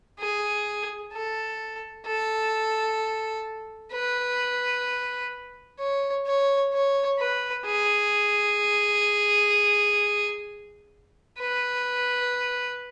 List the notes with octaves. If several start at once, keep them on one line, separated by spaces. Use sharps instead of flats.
G#4
A4
A4
B4
C#5
C#5
C#5
B4
G#4
B4